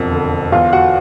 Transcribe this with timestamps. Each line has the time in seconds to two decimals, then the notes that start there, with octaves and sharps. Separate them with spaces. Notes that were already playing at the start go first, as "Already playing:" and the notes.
Already playing: E1 F2
0.12 D3
0.52 E2 F4 F5
0.73 F#4 F#5